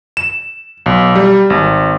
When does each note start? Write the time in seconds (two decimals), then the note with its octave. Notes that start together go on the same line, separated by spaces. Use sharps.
0.17 E7
0.86 B1
1.15 G3
1.50 G#1